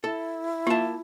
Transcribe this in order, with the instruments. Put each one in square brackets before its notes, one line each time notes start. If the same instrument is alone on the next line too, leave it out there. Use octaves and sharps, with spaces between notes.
[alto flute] E4 [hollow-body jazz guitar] A4
[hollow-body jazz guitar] A#3 A5 [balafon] F4 E5